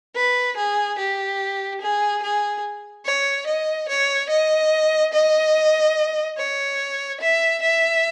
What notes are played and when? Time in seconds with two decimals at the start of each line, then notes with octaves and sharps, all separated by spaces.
0.15 B4
0.57 G#4
0.98 G4
1.81 G#4
2.22 G#4
3.05 C#5
3.47 D#5
3.89 C#5
4.30 D#5
5.13 D#5
6.37 C#5
7.21 E5
7.62 E5